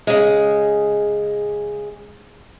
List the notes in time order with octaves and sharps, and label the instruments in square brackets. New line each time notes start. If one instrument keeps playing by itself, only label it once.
[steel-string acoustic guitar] C#3 G#3